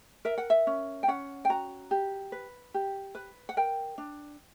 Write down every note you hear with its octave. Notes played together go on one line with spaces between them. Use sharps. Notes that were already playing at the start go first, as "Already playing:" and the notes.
A#4 E5
F#5
E5
C#4
G5
C#4 F#5
G5
F#4 A#5
G4
B4
G4
B4
F#5
A#4 G5
D4